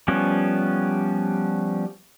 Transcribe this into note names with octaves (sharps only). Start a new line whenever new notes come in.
F3 G3 B3 C#4